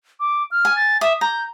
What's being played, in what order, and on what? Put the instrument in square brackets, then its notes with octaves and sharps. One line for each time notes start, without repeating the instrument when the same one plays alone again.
[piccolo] D6
F6
[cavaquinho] G#5
[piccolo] A6
[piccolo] E5 [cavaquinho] D#6
[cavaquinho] A#5 [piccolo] G6